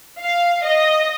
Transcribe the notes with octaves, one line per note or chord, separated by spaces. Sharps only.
F5
D#5